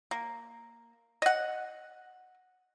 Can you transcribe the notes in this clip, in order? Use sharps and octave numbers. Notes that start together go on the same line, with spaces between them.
A#3
D#5 F#5